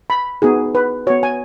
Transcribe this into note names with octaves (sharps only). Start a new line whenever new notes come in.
B5
B3 D#4 F#4 G#4
B4
B3 F#4 C#5
G#5